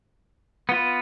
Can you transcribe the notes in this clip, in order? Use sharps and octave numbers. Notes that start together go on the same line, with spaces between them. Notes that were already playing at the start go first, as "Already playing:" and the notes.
B3 F4 B4